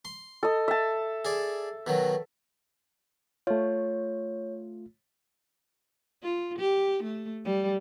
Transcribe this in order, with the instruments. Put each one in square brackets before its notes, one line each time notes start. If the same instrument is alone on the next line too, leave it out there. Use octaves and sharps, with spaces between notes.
[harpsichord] C6
[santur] A4 D#5
E5 A5
[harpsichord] G#4 D5
B2 D#3 F#3
[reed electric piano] A3 F4 [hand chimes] C#5
[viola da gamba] F4
G4
A3
G3